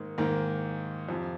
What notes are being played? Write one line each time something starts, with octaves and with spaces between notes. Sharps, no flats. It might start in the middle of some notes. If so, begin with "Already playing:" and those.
Already playing: G#2 D#3 A#3
G#2 D#3 A#3
F2 C3 F3